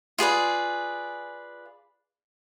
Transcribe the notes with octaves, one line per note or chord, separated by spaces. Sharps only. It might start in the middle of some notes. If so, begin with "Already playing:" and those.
F4 G#4 B4 D5